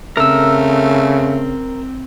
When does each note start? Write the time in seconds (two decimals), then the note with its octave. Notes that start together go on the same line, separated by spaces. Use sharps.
0.17 C#3 A3 C4 A#4 E6